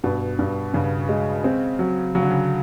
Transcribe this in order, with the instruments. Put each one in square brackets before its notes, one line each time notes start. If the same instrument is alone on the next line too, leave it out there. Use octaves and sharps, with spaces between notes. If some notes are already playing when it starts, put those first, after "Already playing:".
[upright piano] G2 [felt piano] B2
[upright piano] G2
[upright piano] G2 [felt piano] C#3
[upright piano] G#3
C4
F#3
[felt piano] C#3 [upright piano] F#3
[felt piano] D3
C#3